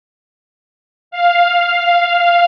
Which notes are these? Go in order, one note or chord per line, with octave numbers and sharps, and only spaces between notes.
F5